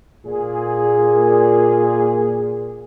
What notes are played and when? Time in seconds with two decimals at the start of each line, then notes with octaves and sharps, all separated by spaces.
0.25 A#2 G#4